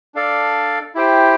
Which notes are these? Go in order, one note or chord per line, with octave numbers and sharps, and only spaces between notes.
D4 A4 D5 F5
E4 G4 C5 G5